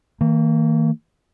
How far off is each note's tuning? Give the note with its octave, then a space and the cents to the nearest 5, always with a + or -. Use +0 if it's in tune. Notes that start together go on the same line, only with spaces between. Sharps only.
D#3 +45 A#3 -30